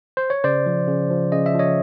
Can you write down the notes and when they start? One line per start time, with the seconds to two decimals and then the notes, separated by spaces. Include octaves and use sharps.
0.17 C5
0.30 C#5
0.44 C#3 C5 D5
0.66 F3
0.88 C#3
1.10 F3
1.32 C#3 D#5
1.46 E5
1.54 F3
1.59 C#5 D#5